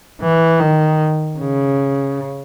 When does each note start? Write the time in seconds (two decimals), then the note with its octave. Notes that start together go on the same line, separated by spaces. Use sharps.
0.22 E3
0.60 D#3
1.39 C#3